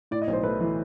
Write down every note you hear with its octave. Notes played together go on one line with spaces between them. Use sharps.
A2 D5
D#5
B1
C5
A3 B4
E3